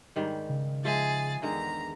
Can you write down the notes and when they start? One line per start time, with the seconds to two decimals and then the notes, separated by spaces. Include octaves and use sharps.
0.16 G#2 D#3 G3
0.49 C#3
0.85 F3 G#3 G#4 E5 A6
1.42 E2 D3 D#3 G#3 A#5